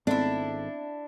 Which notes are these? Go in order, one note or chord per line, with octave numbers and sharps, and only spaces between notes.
G#1 G#2 A3 B3 C4 D4 E4